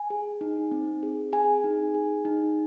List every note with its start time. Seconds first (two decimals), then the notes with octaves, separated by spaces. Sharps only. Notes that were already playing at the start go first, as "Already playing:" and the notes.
Already playing: G#5
0.10 G#4
0.41 D#4
0.71 C4
1.03 G#4
1.32 G#4 G#5
1.64 D#4
1.95 G#4
2.25 D#4